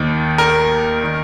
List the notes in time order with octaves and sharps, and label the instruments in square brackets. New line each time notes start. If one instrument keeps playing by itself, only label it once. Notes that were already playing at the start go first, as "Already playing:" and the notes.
Already playing: [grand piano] D#2 D#3
A#4
D#3